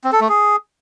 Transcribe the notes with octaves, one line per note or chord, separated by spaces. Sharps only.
C4
A4
A3
G#4